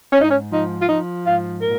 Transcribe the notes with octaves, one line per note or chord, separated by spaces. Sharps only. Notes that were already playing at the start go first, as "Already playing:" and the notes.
G#2 C#4
D#4
C#4
F3 D#4
F4
F3 D#4
G#2 F4
A#2 A#4